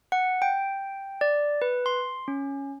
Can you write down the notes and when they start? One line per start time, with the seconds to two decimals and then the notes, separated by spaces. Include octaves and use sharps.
0.12 F#5
0.42 G5
1.21 D5
1.62 B4
1.86 C6
2.28 C#4